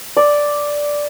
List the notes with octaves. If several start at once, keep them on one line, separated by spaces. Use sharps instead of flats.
D5